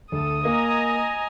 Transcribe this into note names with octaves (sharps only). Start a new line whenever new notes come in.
D2 A4 D#6
A#3 D#5 G#5 A#5